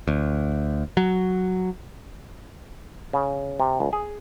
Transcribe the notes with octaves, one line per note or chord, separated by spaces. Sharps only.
D2
F#3
C#3
C3
C#2
G#4